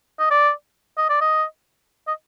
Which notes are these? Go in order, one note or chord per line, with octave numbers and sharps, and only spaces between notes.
D#5
D5
D#5
D5
D#5
D#5